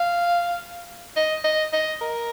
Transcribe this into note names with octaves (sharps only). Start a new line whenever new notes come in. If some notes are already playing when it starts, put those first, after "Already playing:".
Already playing: F5
D#5
D#5
D#5
A#4